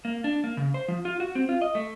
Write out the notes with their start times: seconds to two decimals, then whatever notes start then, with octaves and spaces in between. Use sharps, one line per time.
0.05 A#3
0.24 D4
0.44 A#3
0.57 C#3
0.74 C5
0.88 F3
1.05 F4
1.20 F#4
1.35 C4
1.49 F4
1.61 D#5
1.75 A3